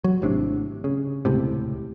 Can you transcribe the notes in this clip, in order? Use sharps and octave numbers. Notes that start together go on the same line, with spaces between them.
F#3
G#1 A2 C3 D4
C#3
D#1 C#2 A2 C3